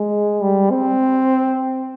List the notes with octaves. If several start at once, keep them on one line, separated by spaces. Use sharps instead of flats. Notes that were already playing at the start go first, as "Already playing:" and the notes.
Already playing: G#3
G3
C4